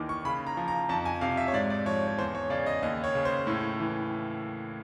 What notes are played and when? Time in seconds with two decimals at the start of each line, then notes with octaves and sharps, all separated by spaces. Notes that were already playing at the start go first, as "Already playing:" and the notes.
Already playing: D#2 D#3 E3 D6
0.09 C#6
0.25 C#3 B5
0.46 A#5
0.57 F3
0.68 A#5
0.89 F2 A5
1.05 G#5
1.21 C3 F5
1.37 E5
1.48 C#5
1.53 G#2 D5
1.70 D5
1.86 F3 C#5
2.08 C#5
2.18 E2 C5
2.35 C#5
2.50 C#3 D5
2.66 D#5
2.83 D#2 D#5
3.04 C#5
3.15 C#3
3.25 C5
3.47 A2
3.80 E3